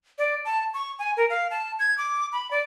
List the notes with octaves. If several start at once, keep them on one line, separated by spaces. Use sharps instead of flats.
D5
A5
C#6
G#5
A#4
F5
A5
G#6
D6
B5
D5